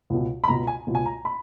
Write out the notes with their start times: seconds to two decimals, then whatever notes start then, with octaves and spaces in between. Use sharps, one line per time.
0.10 C#2 B2
0.44 B5
0.48 C#2 B2 A#5
0.67 G#5
0.87 C#2 B2
0.95 G#5
1.06 A#5
1.25 B5